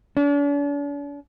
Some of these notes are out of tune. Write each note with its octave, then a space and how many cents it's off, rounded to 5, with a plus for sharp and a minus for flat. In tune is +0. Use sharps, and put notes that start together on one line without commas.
D4 -45